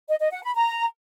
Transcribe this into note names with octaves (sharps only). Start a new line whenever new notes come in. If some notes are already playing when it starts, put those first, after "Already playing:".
D#5
D#5
F#5
B5
A#5